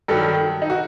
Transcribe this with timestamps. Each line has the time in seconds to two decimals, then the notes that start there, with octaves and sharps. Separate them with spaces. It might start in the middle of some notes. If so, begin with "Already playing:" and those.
0.08 G2 D#3 F#3 A4
0.62 D#4
0.70 F#4